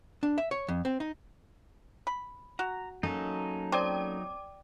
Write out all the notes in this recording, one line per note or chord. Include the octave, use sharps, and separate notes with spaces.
D4
E5
C#5
F2
C4
D#4
B5
F#4 A#5
F#3 A#3 C#4 D#4 A4
C4 D5 G5 D6